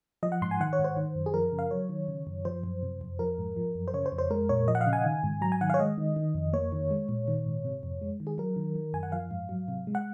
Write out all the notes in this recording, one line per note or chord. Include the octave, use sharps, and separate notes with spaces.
F3 D#5
F#5
G#2 C6
G#5
D#3 F#5
C#5
G#2
C5
D#3
F#2
G#4
F3 A#4
C#3
F5
F#3 C#5
D#3
C#3
F#2
F3 C5
F#2
C3
F2
F3 A#4
G#2
F3
F#2
C5
C#3 C#5
C5
F2
C5
G#3 A#4
A#2 C#5
F3 D#5
F#5
F5
C#3
G#5
D#3
G#2
F#3 A#5
G#5
D#3 F#5
C#5 F5
G#3 D#5
D#3
D#3
F2
A#3 C#5
D#3
G#3
A#2
D#3
G#2
C3
F2
G#3
D#3
G#4
F#3 A#4
D#3
D#3
F#2 G#5
F#5
F3 F5
G#2
F#3
C3
G#3
F#5